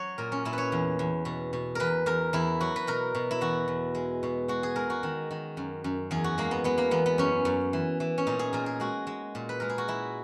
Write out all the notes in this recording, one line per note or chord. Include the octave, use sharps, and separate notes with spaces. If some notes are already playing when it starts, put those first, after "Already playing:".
Already playing: F#3 C#5
A#2 A#4
C#4
A#2 E4
B4 C#5
E2
E2
B2
B2
E2 A#4 B4
E2 A#4
E2 E4
F#3 F#4
B4
B2 A#4
B2
E4
E2 F#4
E2
G#3
B2
G#3 F#4
G#4
G#3 A#4
F#4
D#3
D#3
F#2
F#2
E2 G#4
F#4
G#3 A#3
B3
G#3 B3
A#3
E2 B3
B3
F#2 C#4
F#2
E3
E3
C#4
A#2 D#4
G#4
A#2 A#4
G#4
G#3 F#4
G#3
A#2
B4
G#3 A#4
G#4
F#4
G#3 E4